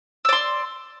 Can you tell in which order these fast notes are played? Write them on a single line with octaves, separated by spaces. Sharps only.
E6 D5 C6